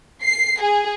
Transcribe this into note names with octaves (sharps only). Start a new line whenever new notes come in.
C7
G#4